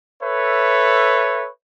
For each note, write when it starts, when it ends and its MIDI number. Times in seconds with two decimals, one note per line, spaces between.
0.23 1.49 69
0.23 1.49 71
0.23 1.49 73
0.23 1.49 76